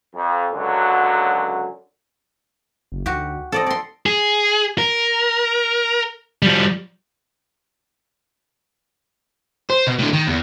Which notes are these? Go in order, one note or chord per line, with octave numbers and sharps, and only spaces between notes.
F2
C#2 F#2 D3 F#3
F#1
D2 F#4 G4
C4 A4 D5 D#5
D5 C6
G#4
A#4
F3 G3
C5
B2
A2 D3
D#3
E2